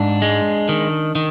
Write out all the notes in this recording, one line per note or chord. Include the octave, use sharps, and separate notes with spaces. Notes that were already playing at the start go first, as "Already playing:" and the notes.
Already playing: G#2 D4
G#3
D#3
D#3